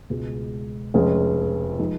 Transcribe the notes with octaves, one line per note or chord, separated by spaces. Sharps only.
C#2 B2 G#3
F1 F2 F3 G#3 C#4
F3 G#3 D#4